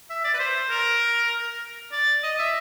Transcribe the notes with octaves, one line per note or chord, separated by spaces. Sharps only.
E5
D5
B4
C5
A#4
D5
D#5
E5